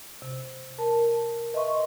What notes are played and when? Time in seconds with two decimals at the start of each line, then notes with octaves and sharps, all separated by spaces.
0.22 C3
0.78 A#4 A5
1.53 B4 D#5 E5 C6 C#6